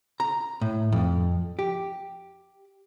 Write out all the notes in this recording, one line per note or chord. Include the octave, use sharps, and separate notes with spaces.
A#5
A2
F2
G4